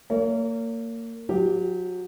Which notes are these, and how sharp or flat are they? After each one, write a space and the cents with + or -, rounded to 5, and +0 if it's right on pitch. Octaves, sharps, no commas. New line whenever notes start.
A#3 -25 C#5 +35
F#3 -30 G4 +0